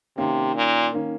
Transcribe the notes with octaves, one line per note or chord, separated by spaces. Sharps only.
C3 D#3 A#3 C#4
A#2
D#3 A#3 C#4